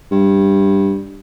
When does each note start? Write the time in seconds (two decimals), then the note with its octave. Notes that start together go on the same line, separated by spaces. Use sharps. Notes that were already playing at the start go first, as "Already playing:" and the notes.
0.11 G2